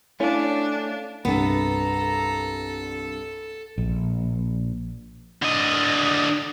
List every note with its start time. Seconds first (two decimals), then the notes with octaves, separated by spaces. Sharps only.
0.20 A3 C#4 D4 E4 C#5 F5
1.25 C2 G2 B3 A4 A#5
3.78 A#1
5.42 D3 D#5